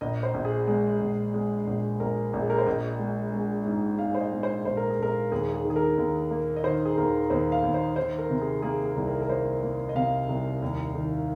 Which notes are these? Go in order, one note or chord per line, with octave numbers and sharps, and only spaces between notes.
A#1 D#5
C5
A#1
G#4
G#3
A#1
G#3
A#1
A#1 A#4
A#1
G#4
A#4
C5
A#1 D#5
G#3
G#3
G#2
G#2 F5
C5
D#5
G#3
C5
A#1 C5
A#4
G#4
A#1 A#4
D#2 G#4
G#4
D#3
G#4
A#4
D#2
A#3
D#5
D#3 C5
G#4
D#2 A#4
D#2 C5
F5
D#2
C5
D#3 C5
A#4
C3
G#4
A#3 G#4
G#4
C2
A#4
A#4
A#3 C5
A#3
D#5
C3 F5
C2
D#2
D#3